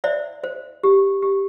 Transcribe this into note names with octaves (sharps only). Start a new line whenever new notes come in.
C5 D5 E5
C5
G4
G4